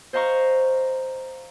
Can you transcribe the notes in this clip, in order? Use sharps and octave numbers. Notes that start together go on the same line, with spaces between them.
C5 D#5 F5 A#5 C#6